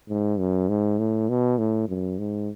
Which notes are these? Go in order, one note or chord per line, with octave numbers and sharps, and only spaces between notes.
G#2
F#2
G#2
A2
B2
A2
F#2
G#2